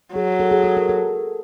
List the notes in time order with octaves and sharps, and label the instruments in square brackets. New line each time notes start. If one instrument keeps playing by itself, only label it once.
[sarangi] F#3 [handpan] G#4
[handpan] A4
G#4
A4
A#4
A4